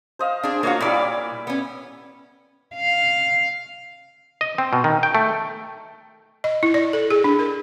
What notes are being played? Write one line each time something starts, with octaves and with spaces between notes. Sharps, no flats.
C5 D#5 F5
D4 G#4
A#3 F4 F#4 C#5 F5
A#2 G3 E4 D5 B5
B3 C#4
F5
D#5
C4
B2
D#3
G5
A3
D#5
E4
D5
A4
G#4
D4
A#4